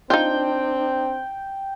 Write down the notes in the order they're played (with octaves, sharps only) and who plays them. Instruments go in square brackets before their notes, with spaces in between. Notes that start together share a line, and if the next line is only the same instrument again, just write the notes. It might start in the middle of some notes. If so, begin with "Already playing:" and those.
[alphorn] C4 [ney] D4 [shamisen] D#4 F4 [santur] G5